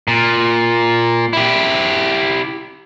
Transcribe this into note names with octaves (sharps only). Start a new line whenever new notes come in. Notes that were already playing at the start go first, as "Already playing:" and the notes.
A#2
E4 G4